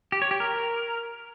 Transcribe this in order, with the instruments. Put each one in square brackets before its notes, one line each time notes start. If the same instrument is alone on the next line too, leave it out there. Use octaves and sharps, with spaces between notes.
[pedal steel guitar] G4
C#5
G4
A#4